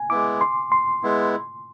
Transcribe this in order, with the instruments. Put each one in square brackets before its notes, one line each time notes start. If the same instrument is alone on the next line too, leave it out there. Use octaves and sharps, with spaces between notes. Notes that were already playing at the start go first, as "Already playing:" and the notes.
Already playing: [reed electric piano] G#5
[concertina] G#3 B3 E4 [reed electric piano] D6
[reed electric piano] C6
C6
[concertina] G#3 B3 E4